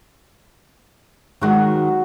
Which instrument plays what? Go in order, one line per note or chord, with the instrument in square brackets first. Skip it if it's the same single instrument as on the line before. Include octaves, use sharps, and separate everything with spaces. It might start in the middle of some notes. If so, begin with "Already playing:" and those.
[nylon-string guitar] D#3 G#3 [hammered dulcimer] F#3 F#4